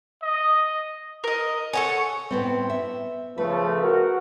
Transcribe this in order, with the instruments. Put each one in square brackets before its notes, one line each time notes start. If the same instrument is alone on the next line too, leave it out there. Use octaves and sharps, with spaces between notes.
[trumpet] D#5
[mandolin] A#4 D#5
[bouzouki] A4 F#5 G#5 [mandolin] C#5
[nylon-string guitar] A2 B3 C4
E5
[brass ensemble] C#3 F3 A3 [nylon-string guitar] B4
[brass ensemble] F#4 A#4